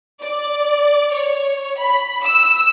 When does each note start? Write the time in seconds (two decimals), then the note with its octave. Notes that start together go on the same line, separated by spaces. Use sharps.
0.21 D5
1.13 C#5
1.78 B5
2.23 E6